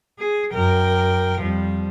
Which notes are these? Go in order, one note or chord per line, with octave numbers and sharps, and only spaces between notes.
G#4
F#2 A#4 G5
F2 F3 G3